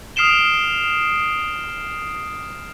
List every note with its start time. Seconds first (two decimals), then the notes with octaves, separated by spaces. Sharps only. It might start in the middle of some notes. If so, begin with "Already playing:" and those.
0.16 D#6 F6 C7 D7 E7 G7